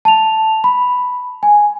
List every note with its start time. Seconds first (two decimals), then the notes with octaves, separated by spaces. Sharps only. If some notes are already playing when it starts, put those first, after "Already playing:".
0.05 A5 F7
0.64 B5
1.43 G#5